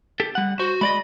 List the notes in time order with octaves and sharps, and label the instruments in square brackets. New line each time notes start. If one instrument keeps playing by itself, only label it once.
[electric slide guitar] G4 A4
G3 F#5
[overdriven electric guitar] F#4 [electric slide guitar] C5
[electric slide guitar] G#3 D5 D#5 [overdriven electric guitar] B5